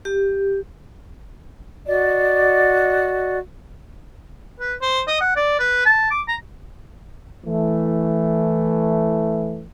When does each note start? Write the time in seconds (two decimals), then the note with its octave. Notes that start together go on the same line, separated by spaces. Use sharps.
0.05 G4
1.87 F#4 D5 D#5
4.60 B4
4.82 C5
5.08 D#5
5.21 F#5
5.36 D5
5.60 B4
5.86 A5
6.11 D6
6.28 A#5
7.46 E3 A3